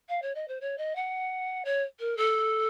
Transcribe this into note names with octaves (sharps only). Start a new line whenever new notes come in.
F5
C#5
D#5
C5
C#5
D#5
F#5
C#5
A#4
A4